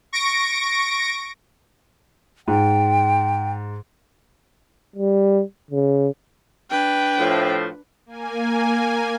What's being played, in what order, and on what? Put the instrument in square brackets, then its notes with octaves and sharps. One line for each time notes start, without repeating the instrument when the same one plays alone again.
[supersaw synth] C#6 A#6 D7
[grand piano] G#2 [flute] G5
[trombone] G3
C#3
[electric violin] D4 B4 [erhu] G5
[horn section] A2 F3
[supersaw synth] A#3 G#5